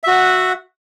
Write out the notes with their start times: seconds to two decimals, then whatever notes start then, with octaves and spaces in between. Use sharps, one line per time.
0.03 E5
0.07 F#4
0.11 F#5